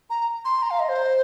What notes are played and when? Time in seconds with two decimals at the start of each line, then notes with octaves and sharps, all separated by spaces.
0.10 A#5
0.45 C6
0.62 A#5
0.70 F5
0.80 D#5
0.89 C5